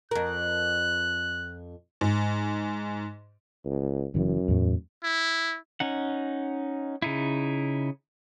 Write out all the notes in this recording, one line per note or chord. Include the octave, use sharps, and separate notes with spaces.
F2 A#4 F#6
G#2
C#2
F#1 F#2 E3
E2 A2 A3
E4
C#4 D#4 F#5
C#3 D#4 E4